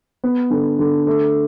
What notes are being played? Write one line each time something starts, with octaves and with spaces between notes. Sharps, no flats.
B3
D3
D3
A3